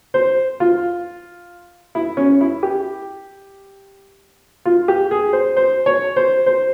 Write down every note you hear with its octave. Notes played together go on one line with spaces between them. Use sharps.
C5
F4
E4
C#4
E4
G4
F4
G4
G#4
C5
C5
C#5
C5
C5